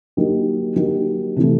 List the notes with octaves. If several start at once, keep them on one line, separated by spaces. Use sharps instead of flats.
F#3 A#3 D#4 G4
F#3 A#3 D#4 G4
C3 E3 A3